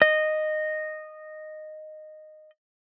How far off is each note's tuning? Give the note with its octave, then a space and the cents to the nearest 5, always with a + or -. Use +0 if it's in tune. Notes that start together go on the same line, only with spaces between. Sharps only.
D#5 -10